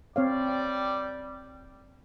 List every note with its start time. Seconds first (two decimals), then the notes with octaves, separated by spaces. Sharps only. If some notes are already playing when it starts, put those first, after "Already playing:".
0.16 G3 C4 C#5 D5 F5